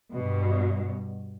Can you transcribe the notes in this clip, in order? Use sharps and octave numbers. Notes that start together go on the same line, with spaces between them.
G2 B2